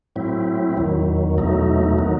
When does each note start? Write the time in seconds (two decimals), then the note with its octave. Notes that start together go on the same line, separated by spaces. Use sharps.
0.16 A2 F#3 C4 E4
0.77 E2 D#3 F#3
1.38 E2 B2 F#3 A3 D#4
1.98 D#3 F#3 B3 D#4